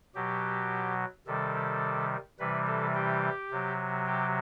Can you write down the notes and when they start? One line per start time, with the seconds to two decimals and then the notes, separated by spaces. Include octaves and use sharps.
0.15 B2 F#3 G4
1.27 C3 D#3 G3 A4
2.39 C3 E3 G3 B4
2.67 A4
2.95 G4
3.51 C3 F#3
4.07 G4